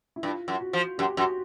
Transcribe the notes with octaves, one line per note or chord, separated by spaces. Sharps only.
E4
G2 F4
F#2
F#4
F3
F#2 G4
F#2 F#4